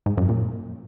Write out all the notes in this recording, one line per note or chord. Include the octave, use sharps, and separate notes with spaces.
G#2
F#2
A#2